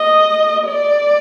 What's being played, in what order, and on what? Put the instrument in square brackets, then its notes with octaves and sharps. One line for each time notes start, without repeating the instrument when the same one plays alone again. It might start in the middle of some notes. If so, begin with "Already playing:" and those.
Already playing: [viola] D#5
D5